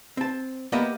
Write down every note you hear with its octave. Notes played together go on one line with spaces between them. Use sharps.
C4 A5
A#3 B3 G4 A#4 D#5 E5